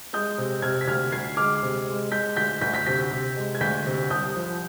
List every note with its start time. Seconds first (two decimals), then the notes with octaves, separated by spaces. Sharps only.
0.13 G#3 D#6 G6
0.38 C3
0.62 C3 F6 G#6
0.81 B6
0.87 D2 F6 G#6
1.12 D2 G#6 C7
1.37 G#3 D6 F6
1.62 C3
1.87 G#3
2.12 G#3 G6 B6
2.37 D2 G6 B6
2.61 D2 G6 B6
2.74 G6 B6
2.87 C3 G6 B6
3.11 C3
3.36 G#3
3.55 G#6
3.61 D2 G6 B6
3.86 C3
4.10 C2 D#6 G6
4.36 F3